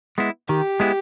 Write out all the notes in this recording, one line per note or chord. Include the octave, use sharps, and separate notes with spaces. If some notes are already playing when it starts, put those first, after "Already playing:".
G#3 B3 E4
D#3 G4
G#3 B3 E4